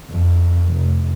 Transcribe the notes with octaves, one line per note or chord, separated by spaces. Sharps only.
F2
F1